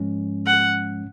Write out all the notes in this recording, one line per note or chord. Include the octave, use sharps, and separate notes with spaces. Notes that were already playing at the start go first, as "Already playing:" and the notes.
Already playing: G#2 F3 G#3 C#4
F#5